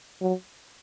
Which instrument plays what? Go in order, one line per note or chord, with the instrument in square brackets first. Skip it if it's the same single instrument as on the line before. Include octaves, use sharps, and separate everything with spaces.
[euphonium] F#3